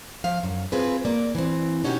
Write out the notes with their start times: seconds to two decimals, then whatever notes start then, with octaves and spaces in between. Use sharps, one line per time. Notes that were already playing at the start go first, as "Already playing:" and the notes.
0.24 F3 F5
0.43 F#2
0.72 C4 F4 G#4 B4
1.05 A#3 D5
1.35 E3 C4
1.84 B2 C#4 D#4 F#4 G4